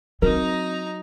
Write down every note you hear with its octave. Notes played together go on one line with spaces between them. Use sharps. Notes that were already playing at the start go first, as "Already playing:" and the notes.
F#3 C4 D#4 A#4 A#5